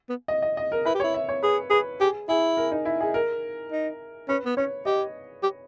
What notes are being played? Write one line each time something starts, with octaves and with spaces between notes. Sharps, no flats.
B3
D#5
D#5
D#5
A#4
E4 B4
G4
C#5
E4
E5
C#5
G#4 B4
G#4 B4
G4 G#4
E4 G#4
A#4
D#4
E4
G#4
A#4
D#4
C#4 B4
B3
C#4 C#5
G4 D#5
G4